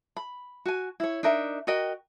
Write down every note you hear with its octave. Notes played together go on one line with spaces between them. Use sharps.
B5
F#4 G#5
E4 C#5
D4 D#4 A#4 E5
F#4 A#4 D#5 G5